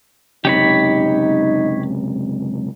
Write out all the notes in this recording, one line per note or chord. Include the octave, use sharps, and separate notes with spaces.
C#2 F#2 C3 D#4 G4 C#5 B5